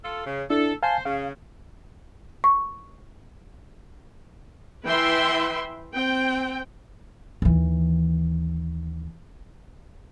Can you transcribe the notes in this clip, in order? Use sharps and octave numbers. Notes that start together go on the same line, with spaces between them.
F4 A4
C#3
D4 E4 A4
C5 F5 G#5 A5
C#3 F5
C#6
E3 B4 E5 G5 C6
C4 G5
D#2 E3